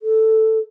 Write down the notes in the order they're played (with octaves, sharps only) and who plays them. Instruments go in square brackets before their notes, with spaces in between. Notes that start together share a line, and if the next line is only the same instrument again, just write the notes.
[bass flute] A4